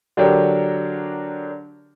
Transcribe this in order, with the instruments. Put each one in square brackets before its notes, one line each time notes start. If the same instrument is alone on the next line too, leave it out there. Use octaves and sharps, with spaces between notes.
[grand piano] D3 F#3 D4 G4 A#4